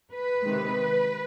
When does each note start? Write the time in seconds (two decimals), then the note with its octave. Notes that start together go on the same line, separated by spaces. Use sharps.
0.12 B4
0.43 C3 D#3 G#3